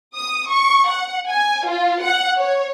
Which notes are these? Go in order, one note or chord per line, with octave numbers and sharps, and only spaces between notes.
D#6
C#6
F#5
G#5
F4
F#5
C#5